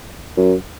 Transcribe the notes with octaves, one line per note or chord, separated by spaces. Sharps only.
F#2